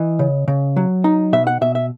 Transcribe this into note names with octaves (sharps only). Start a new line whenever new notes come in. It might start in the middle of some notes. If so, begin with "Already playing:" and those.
Already playing: E3 D#5
C#3
C#3
F#3
D#4
B2 E5
F#5
B2 E5
E5